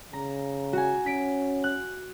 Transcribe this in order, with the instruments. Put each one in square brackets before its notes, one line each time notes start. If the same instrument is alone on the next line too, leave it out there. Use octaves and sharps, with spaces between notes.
[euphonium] C#3 [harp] A#5
[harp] F#4 G#5
[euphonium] C#4 [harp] B6 D7
[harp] F#6